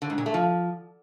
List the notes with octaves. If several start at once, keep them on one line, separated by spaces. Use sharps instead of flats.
D3
G#2
A#2
A3
F3